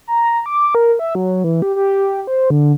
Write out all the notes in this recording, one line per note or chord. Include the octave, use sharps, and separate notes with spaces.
A#5
D6
A#4
E5
F#3
E3
G4
G4
C5
D3